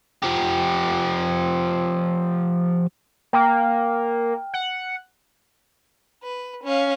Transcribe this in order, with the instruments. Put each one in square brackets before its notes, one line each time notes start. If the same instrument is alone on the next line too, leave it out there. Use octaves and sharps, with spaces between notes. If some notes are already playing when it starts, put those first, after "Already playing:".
[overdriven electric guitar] F3 G4
[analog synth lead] A#3 [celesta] G5 F6
[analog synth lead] F#5
[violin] B4
C#4 F5